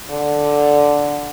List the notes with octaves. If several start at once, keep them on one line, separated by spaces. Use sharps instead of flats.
D3